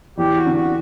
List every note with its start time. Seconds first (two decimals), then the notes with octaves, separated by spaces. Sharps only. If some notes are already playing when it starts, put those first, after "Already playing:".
0.18 E2 G4
0.37 F#4
0.47 D3
0.56 F#4